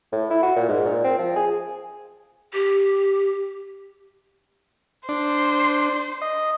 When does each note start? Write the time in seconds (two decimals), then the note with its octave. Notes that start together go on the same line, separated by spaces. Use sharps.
0.12 A2
0.30 E4
0.43 F#4
0.56 A#2
0.69 G#2
0.86 A#2
1.04 C4
1.19 F3
1.36 G#4
2.53 G4
5.09 D4 C5
6.22 D#5